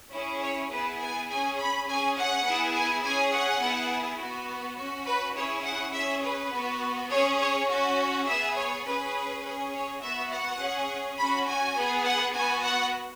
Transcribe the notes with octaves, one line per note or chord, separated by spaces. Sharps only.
C#4 E4 G#4
C#5
B3 E4 G#4 B4
G#5
C#4 G#4 G#5
B5
C#4 G#4 G#5
F#5
B3 E4 G#4
G#5
C#4 G#4 G#5
F#5
B3 E4 G#4
B3 F#4
C#4 F#4
B4
C#4 E4 G#4 C#5
F#5
C#4 G#4 E5
B4
B3 F#4
C#4 G#4 C#5
C#5
C#4 F#4
B3 G#4 E5
C#5
C#4 G#4 B4
C#4 G#4
C#5
B3 F#4 E5
F#5
C#4 G#4
C#4 F#4 B5
G#5
B3 G#4
F#5
B3 F#4 G#5
F#5